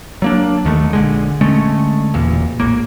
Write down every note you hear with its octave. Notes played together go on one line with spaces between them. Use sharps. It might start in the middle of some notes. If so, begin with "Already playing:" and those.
F#3 A#3 D4
D#2 D#3 A3
A#1 D3 G#3
D3 G#3 A3 C#4
E1 E2 A#2
A#1 A2 A#3